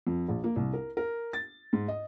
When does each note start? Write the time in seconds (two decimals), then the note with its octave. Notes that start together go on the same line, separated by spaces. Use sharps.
0.07 F2
0.29 A#1
0.44 A#3
0.56 C2
0.73 A#4
0.97 A#4
1.33 A6
1.73 G#2
1.88 D#5